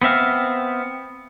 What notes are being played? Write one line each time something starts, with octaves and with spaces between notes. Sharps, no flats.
B3 C4 E5 F5